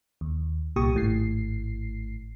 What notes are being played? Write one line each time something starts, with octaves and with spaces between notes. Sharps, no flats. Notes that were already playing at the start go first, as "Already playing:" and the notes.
D#2
C2 A#2 G4 C#6 D#6
G#1 A2 C7